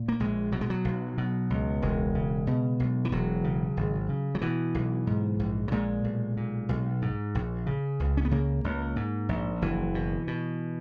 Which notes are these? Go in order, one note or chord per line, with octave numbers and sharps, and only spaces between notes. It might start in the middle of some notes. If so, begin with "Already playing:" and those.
Already playing: A#2
A#3
A#1 G#3
B2 F#3
G#3
F#3
B1
B2
C#2
E1 G#3
C#3
B2
B1
E3
E1 F#3
C#3
G#1
C#3
F#3
B2 E3
B1
G#2
A#1
F#3
A#2 G#3
B1
A#2
B1
G#2
A#1
C#3
C#2
C#4
B3
C#3 A#3
C#2
G#2
A#1
F#1 E3
B2
B2